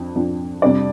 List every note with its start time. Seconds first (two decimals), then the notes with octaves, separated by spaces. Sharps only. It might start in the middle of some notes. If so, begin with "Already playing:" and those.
Already playing: F2 F3 D4
0.16 F2 F3 D4
0.62 F2 C3 G3 D4 D5